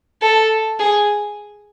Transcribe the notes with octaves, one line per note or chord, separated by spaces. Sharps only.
A4
G#4